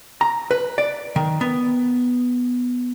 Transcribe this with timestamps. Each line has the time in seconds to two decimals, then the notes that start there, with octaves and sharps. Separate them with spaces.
0.21 A#5
0.51 B4
0.78 D5
1.16 D#3
1.41 B3